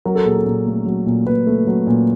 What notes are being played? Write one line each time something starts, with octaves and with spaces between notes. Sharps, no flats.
F#3 A#4
A4
A#2 G#4
A4
A#2
A3
F#3
A#2
A#2 B4
A3
F#3
A#2